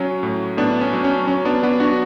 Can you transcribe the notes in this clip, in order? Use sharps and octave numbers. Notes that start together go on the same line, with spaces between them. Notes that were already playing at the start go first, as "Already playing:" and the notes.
Already playing: F#3 C#4
A2
A2 B3 D4
C#4
F#3
C#4
F#3 C#4
B3 D4
F#3 B3 D4
D4 F#4